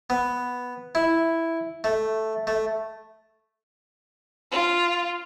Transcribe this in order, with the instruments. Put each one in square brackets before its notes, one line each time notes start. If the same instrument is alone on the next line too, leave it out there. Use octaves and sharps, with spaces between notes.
[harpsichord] B3
E4
A3
A3
[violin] F4